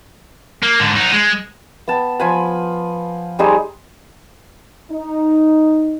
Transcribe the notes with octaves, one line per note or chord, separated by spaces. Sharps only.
A#3
G#2 D3
F#3 D#4
G#3
B3 G5 A5
F3 G#5 B5
G3 D#4 G#4 C5
D#4